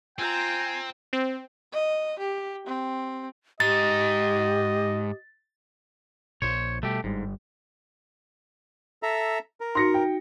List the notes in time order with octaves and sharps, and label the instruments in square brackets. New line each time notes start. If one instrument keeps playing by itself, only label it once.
[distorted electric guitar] C4 [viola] F4 A#5 [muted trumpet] G5 [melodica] G#5
[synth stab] C4
[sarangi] D#5
G4
C4
[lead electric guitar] G#2 [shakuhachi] G4 [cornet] D#5 [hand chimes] A6
[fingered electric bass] A#1 A#2 [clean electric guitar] C5 C#5
[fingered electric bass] B2 G3 [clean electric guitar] A3 G4
[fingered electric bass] G1 G3 [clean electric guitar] G#2
[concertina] A4 E5 A#5
A#4
[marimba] D#4 F#4 [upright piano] C6 A#6 C#7
[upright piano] G5